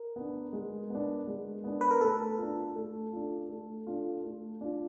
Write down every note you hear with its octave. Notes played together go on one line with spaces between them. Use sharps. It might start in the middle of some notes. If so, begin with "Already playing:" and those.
Already playing: A#4
B3 D4
G#3
B3 D4
G#3
B3 D4
B4
A#4
A3 A4
D4 F4
A3
D4 F4
A3
D4 F4
A3
D4 F4